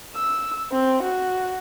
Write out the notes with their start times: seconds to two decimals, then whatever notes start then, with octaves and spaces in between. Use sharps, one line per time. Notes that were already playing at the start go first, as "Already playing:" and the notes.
0.15 E6
0.72 C4
1.03 F#4